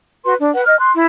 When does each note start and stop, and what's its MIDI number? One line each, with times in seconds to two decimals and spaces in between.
0.24 0.33 66
0.24 0.33 71
0.24 0.33 84
0.38 0.49 62
0.53 0.63 71
0.53 0.63 78
0.65 0.77 75
0.65 0.77 89
0.79 0.90 84
0.79 0.90 90
0.94 1.05 64